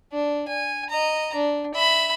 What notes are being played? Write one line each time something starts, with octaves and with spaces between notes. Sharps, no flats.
D4
G#5
D#5 A#5
D4
E5 B5